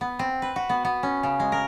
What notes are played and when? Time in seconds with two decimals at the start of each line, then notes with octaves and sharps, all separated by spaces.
0.01 B3
0.19 C4
0.42 B4
0.56 F#4
0.69 B3
0.85 B3
1.03 C#4
1.23 C#3
1.39 G#3
1.52 A#4